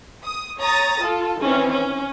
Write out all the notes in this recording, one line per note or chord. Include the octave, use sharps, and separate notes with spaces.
D#6
C#5 A#5 D#6 A6 A#6
F4 A4
D#3 E3 C4 C#4
C#4